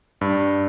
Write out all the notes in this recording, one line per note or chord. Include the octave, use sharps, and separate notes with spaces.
G2